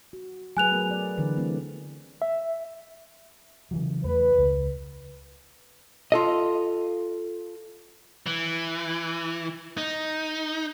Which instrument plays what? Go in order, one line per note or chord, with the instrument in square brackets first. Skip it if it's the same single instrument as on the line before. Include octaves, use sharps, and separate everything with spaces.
[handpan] F#4
[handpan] F#3 G#4 B4 [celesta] G#5 F#6 F7
[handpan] A3 B3 A#4
D5
D3 E3 B4
A3 C4 E4
[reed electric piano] E5
[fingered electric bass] C#3 E3 F#3
[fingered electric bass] E2 A3 [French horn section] B4
[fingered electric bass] C#2
[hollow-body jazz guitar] F4 A4 D#5
[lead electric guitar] E3
D#4